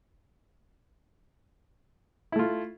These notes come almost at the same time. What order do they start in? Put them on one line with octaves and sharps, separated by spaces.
E4 A3 F4